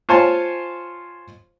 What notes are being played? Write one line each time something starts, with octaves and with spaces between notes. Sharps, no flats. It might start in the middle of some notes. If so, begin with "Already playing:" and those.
F4 C5 C#5 G#5 A5